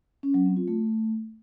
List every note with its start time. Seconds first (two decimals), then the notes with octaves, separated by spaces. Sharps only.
0.23 C#4
0.34 F#3
0.45 C4
0.57 F4
0.68 A3